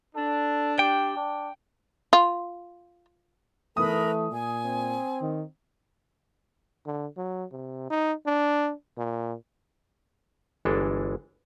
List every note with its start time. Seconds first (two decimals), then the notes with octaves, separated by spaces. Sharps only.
0.16 D4 A4
0.79 G4 G5
1.16 D4
2.13 F4
3.77 E3 A3 A#4 B4 B5 D#6
4.31 A#2 G#5
4.65 C4
5.21 D#3
6.86 D3
7.17 F#3
7.52 C3
7.90 D#4
8.26 D4
8.98 A#2
10.65 G1 E3 G#3 D4 A4